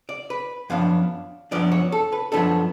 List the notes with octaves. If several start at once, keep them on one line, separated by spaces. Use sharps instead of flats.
D5
B4
F#2 F3 B3 D4 F5
F#2 F3 B3 D4 D5
C#5
A4
B4
F#2 F3 B3 D4 A4